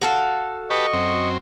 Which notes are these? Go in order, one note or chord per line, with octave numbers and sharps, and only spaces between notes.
F#4 A4 F5
G4 B4 D#5 A5 C#6
F#2 C4